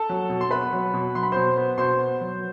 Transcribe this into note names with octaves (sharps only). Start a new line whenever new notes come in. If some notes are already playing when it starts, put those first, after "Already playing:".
Already playing: A4 A5
F#3
B2
C6
B3 B4 B5
F#3
B2
F#3 C6
B5
B2 C5 C6
B3
B2 C5 C6
B3
F#3